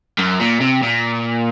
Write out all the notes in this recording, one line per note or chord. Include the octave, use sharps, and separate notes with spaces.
F#2
A#2
C3
A#2